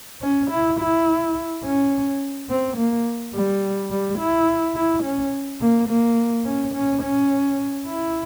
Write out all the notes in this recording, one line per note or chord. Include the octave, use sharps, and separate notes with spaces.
C#4
E4
E4
C#4
C4
A#3
G3
G3
E4
E4
C#4
A#3
A#3
C#4
C#4
C#4
E4